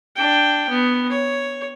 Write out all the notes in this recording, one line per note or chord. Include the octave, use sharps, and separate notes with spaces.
D4 G5
B3
C#5